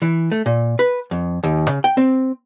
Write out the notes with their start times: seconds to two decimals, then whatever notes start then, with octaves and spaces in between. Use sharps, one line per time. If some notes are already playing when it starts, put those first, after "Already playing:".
0.02 E3
0.32 A3
0.46 A#2
0.79 B4
1.11 F2
1.44 D#2
1.69 C#3
1.84 G5
1.97 C4